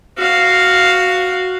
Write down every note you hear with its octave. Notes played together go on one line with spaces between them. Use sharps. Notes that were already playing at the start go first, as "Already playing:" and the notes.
F#4 F5